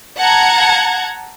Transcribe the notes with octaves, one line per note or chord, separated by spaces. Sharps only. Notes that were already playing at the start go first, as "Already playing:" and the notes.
F#5 A5 A#5 G#6